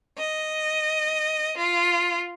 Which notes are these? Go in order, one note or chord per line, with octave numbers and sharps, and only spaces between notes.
D#5
F4